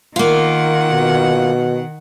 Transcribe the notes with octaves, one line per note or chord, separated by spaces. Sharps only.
D#3 A#3 F4 F#5
B2